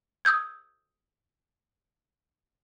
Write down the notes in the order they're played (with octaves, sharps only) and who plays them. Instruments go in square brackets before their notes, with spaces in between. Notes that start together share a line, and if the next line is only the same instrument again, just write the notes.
[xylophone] D#6 E6 G6 G#6